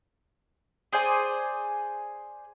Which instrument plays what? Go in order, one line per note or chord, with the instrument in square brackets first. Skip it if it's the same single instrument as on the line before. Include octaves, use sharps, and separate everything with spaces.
[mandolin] G#4 C5 D5 G#5